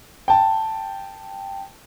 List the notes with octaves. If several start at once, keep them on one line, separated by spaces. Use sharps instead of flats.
G5 A5